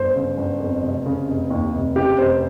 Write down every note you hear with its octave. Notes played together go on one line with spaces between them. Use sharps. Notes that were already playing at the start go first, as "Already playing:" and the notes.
Already playing: G1 C5
C#3
G1
F2
F1
C#3
F1
D#2
F1
C#3 G4
F1 C5